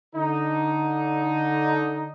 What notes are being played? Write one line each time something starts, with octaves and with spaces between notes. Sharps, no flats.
D3 D#4